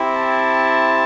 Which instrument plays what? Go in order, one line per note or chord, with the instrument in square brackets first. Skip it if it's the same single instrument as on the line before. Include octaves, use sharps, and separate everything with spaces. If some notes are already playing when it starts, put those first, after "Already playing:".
Already playing: [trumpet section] C4 E4 G4
A5